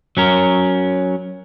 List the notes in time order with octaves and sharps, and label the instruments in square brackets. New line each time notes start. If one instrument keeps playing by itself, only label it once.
[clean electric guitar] F#3 C#4 A#4